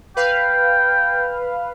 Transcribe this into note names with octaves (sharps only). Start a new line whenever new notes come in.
B4 F5 G5